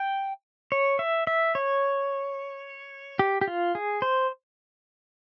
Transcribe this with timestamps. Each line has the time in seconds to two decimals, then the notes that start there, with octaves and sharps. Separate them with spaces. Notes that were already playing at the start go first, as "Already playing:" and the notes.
Already playing: G5
0.72 C#5
0.99 E5
1.27 E5
1.55 C#5
3.19 G4
3.41 G4
3.48 F4
3.75 G#4
4.02 C5